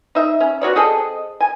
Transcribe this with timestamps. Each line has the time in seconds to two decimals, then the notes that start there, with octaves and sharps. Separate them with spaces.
0.15 D#4 E5
0.40 C#4
0.61 B3 F#4 C#5 D5
0.76 C4 G#4 A4 D#5
1.40 G#5